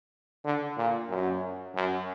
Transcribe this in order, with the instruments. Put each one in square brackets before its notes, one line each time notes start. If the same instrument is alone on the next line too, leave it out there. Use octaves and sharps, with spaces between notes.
[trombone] D3
A#2
F#2
F#2